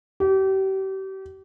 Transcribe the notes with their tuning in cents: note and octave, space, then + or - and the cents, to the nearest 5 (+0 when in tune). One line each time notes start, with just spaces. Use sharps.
G4 -35